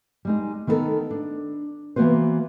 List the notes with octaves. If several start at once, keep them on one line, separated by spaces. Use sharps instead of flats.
G3 G#3 D#4
D#3 B3 D#4 F4 A4 A#4
D4
E3 A#3 B3 F#4 B4 C5